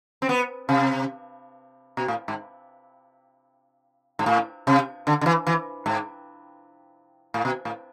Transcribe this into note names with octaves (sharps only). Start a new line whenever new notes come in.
C4
B3
C3
B2
A2
G#2
G#2
A2
C3
D3
D3
E3
E3
G#2
A2
B2
A2